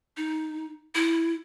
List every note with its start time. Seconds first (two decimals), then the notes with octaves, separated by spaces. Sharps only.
0.17 D#4
0.95 E4